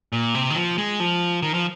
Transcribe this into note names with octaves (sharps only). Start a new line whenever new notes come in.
A#2
C3
D#3
F3
G#3
F3
D#3
F3